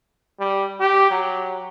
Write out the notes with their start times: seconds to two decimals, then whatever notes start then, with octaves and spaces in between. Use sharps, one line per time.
0.40 G3
0.80 G4
1.11 F#3